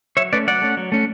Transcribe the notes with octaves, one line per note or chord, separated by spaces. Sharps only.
F#3 C#5 E5
A3 C#4 B4 D5
F#3 D5 F#5
A3 C#4
F#3
A3 C#4